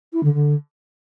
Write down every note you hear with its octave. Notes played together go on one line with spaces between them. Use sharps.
E4
D3
D3